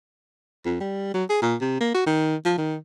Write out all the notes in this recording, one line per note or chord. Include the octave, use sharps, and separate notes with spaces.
F2
G3
F#3
G#4
A#2
C3
A#3
F#4
D#3
F3
D#3